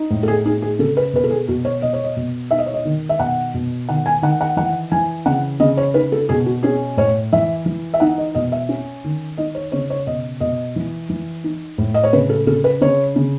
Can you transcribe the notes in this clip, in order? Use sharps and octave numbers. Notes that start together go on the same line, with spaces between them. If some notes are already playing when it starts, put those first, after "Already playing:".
Already playing: D#4
A2
A4
G#4
D#4 G#4
G#4
C#3 A4
B4
B2 B4
A4
G#4
B2 F#4
C#5
B2 D#5
C#5
D#5
B2
D#4 E5
D#5
C#5
D#5
D#3
E5
B2 F#5
B2
D#3 F#5
G#5
D#3 F#5
F#5
E3 F#5
E3 G#5
C#3 F#5
C#3 D#5
C#5
D#4 B4
A4
B2 G#4
F#4
C#4 G#4
A2 C#5
E3 E5
E3
E5
D#4 F#5
D#5
B2 D#5
E5
C#4
D#3
D#4 D#5
C#5
C#3 C#5
C#5
B2 D#5
B2 D#5
E3
E3
D#4
A2
D#5
C#5
C#3 B4
A4
C#3 A4
B4
C#3 C#5
C#3